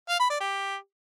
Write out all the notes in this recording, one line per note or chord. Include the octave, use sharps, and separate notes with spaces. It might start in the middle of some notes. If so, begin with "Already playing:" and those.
F5
B5
D5
G4